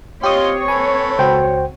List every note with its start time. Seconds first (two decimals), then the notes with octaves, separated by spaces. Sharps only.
0.23 C4 F4 G4 C#5 D#5 C6 D#6
0.68 A4 B4 G#5
1.19 C#2 F#4 C5 G5